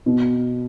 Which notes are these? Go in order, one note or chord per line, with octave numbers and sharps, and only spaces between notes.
B2